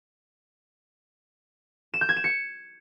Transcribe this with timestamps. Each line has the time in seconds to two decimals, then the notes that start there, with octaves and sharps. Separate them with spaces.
1.94 E7
2.01 G6
2.09 G#6
2.16 E7
2.24 C#7